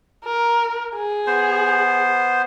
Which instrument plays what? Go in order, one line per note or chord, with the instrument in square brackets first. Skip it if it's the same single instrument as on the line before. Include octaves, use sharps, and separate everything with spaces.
[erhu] A#4
G#4
[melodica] B3 C5